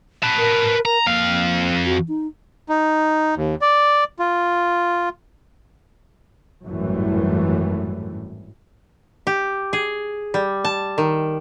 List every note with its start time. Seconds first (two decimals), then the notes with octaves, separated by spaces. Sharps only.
0.23 B4 A5
0.38 A#4
0.85 A#4 A#5
1.06 F2 A#3 F5
1.86 F#4
2.08 D#4
2.69 D#4
3.36 D#2
3.61 D5
4.19 F4
6.66 G#1 F#2 A2 E3 G3 A3
9.27 G4
9.73 G#4
10.34 G3
10.65 A5
10.98 D#3